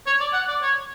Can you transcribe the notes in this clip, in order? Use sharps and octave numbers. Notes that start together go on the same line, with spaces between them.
C#5
D5
F#5
D5
C#5